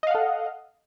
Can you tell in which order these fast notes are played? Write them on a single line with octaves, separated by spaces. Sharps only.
D#5 F5 F#5 A4